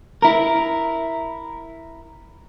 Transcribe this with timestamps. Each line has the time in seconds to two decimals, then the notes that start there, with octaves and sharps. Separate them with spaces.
0.22 E4 A#4